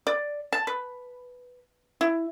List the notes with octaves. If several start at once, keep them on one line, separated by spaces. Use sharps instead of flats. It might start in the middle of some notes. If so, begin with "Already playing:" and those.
D5
A5
B4
E4